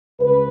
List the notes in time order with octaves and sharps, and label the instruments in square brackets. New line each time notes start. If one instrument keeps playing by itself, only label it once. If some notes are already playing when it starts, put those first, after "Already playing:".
[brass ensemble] C#2 B4